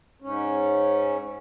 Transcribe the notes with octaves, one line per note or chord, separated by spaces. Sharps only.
G#2 C#4